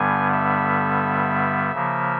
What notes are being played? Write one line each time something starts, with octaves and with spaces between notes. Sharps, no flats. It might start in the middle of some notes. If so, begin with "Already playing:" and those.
Already playing: G2 D3 G3 B3 G#5
E5
C#3 F3 A#3